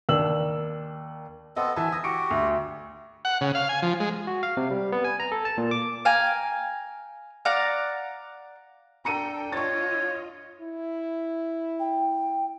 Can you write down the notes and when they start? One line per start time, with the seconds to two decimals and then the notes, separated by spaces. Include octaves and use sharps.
0.09 D#2 D4 E6 F#7
1.56 B3 C4 A4 D#5 F#5
1.76 E3 E5 G#5 A5
1.92 D#6 A#6
2.04 F#4 G4 C#7 D7
2.31 D2
3.25 F#5
3.41 C#3
3.55 F5
3.69 G#5
3.82 F3
4.00 G#3
4.27 F#4
4.43 F5
4.57 C3
4.71 G3
4.92 B3
5.04 G#5
5.20 A#5
5.32 A4
5.45 A5
5.58 A#2
5.71 D6
6.05 F5 G5 G#5 A#5
7.45 D5 F5 F#5 A#5
9.05 D4 A4 G5 A#5 C#7 D#7
9.52 F4 C#5 D#5 C#6 A6
10.61 E4
11.80 G5